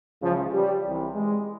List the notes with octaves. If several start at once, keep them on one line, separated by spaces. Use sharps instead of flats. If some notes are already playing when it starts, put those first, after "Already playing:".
C#2 C#3 E3 F3
G3
C2 C3 E3
G#3